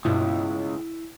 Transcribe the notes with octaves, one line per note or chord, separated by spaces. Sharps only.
C#2 G2 B2 E4